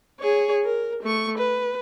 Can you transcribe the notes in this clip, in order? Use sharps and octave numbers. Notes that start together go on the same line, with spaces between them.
G#4 C#5
A#4
A3 C#6
B4